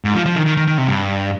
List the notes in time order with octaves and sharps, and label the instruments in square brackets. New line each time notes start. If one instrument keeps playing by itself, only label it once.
[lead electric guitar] G#2
F3
F3
D#3
D#3
D#3
D#3
C3
G2